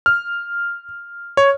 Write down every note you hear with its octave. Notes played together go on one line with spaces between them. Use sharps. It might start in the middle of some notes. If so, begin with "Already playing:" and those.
F6
C#5